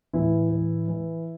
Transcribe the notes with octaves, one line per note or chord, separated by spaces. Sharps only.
A2 E3 E4
E3
E3